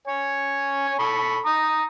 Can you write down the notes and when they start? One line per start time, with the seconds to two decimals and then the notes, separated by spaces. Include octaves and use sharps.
0.08 C#5 G#5
0.99 A4 B5 C#6
1.46 A#5 D#6